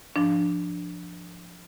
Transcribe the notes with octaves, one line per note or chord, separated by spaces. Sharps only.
G#2 F3 D4